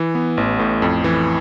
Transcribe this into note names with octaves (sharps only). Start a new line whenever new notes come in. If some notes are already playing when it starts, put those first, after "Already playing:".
Already playing: E3
B3
A1
A2
F2
E3